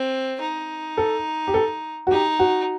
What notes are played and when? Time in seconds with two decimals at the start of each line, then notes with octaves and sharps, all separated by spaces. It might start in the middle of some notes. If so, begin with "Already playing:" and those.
Already playing: C4
0.40 D#4
0.97 A4
1.47 G4
1.54 A4
2.07 F#4
2.11 D#4 G4
2.39 F#4